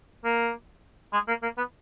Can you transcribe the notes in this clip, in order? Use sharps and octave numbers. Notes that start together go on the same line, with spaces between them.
A#3
G#3
A#3
A#3
B3